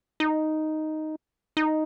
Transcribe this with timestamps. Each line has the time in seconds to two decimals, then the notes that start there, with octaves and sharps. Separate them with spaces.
0.20 D#4
1.57 D#4